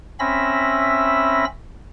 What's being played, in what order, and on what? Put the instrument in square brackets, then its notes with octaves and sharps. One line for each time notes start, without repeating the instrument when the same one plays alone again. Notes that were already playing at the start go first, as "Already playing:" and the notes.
[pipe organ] C4 C#4 E5 B5 E6 A#6